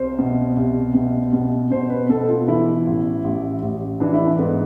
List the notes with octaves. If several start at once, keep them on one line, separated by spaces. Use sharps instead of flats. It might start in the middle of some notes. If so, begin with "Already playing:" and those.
Already playing: C2 C5
B2
C2
B2
B2
B2 C5
B4
B2 A4
F4
E3 E4
A1
A1
A1
E3 D4
E4
D4
G#2 B3